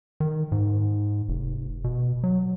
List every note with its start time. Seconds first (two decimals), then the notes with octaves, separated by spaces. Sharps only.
0.20 D#3
0.52 G#2
1.29 F1
1.84 B2
2.23 F#3